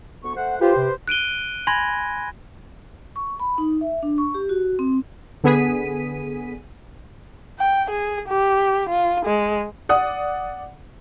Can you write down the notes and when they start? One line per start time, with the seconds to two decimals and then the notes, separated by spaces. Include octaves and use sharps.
0.24 D2 B3 C#6
0.36 A3 C5 F#5
0.61 F4 G4 B4 C5
0.76 C3
1.08 F#6 D7 D#7 G7
1.67 G#5 B5 C6 G#6 A#6
3.16 C#6
3.40 B5
3.58 D#4
3.81 E5
4.03 D4
4.18 C#6
4.34 G4
4.49 F#4
4.79 C4
5.44 D3 B3 G#4 B6 D#7
7.59 G5
7.90 G#4
8.28 G4
8.89 F4
9.25 G#3
9.89 D5 F#5 D#6